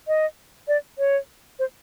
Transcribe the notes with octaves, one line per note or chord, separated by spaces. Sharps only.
D#5
D5
C#5
C5